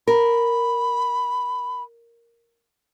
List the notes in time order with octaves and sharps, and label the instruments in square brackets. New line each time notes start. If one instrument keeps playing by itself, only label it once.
[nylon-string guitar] A#4 [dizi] B5